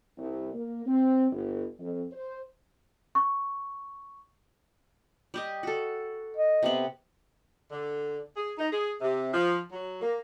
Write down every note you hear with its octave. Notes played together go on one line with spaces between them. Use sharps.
C2
A#3
C4
G1
F2
C5
C#6
G3 G4 D#5
F#4 A4
D#5
C3 B3
D3
G#4
D#4
G#4
C3
F3
F#3
A#3